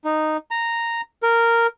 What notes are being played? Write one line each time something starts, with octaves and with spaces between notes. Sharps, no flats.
D#4
A#5
A#4